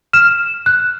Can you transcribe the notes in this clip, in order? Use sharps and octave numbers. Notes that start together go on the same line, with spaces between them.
F6 E7
F#6